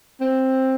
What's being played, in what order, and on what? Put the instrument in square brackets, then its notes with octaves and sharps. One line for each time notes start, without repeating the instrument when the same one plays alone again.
[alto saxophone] C4